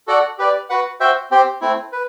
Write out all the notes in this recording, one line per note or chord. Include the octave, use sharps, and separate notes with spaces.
F#4 A4 D5 F#5
G4 B4 D5
F#4 B4 F#5
F#4 C5 E5 G5
C4 G4 C5 G5
A3 C4 E4
B4